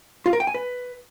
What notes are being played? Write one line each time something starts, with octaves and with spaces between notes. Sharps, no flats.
F4
A#4
G5
G#5
B4